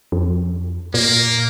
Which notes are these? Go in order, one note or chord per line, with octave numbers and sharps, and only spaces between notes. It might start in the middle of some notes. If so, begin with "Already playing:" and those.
F2
A#2 A#3